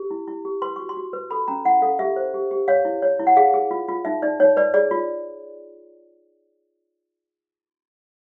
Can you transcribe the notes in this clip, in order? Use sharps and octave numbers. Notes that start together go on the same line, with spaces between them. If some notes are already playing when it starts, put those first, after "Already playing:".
Already playing: G4
E4
E4
G4
B4 C6
F#4 C#6
C6
F#4
B4
A4 B5
C#4 A#5
E4 F#5
A4 F5
G4 E5
C5
G4
G4
C#5 F5
E4
C#5
E4
F#5
G#4 F5
G#4
F4
F4
D#4 E5
D#4 D5
D#4 C#5
B4 D5
G#4 D5
F4